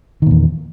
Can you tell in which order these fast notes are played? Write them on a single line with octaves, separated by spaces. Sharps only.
D#3 A#2 E2